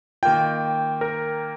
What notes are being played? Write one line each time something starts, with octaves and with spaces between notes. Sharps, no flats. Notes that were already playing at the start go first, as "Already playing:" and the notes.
D#3 A#3 F4 G5
A#4